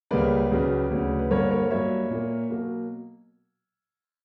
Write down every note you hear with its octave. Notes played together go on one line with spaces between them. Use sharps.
C#2 C#3 G3 A#3 B4 D5
C#2 C#3 F#3 B3
D2 C#3 F#3
B4
G2 D3 A#3 A#4 C#5
A#4 C#5
G2 F#3 A#3 C#5 E5
A#2 A#3
B2 F#3 A#3